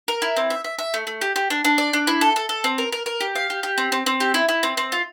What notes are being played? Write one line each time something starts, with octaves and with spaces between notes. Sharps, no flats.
A#4
E4
C4
E5
E5
E5
A3
A3
G4
G4
D4
D4
D5
D4
E4
A4
A4
A4
C4
A#4
A#4
A#4
G4
F5
G4
G4
C4
C4
C4
G4
E4
E4
C4
C4
F4